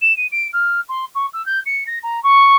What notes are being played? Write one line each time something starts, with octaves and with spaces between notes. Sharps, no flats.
E7
D#7
D7
F6
C6
C#6
E6
G6
C#7
A#6
A#5
C#6